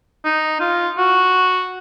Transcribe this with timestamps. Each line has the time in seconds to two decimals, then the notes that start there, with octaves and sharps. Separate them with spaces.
0.25 D#4
0.61 F4
0.98 F#4